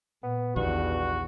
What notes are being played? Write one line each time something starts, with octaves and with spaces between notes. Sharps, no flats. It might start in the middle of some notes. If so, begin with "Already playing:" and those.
A#2 B3
A#1 E2 G2 D#3 F#4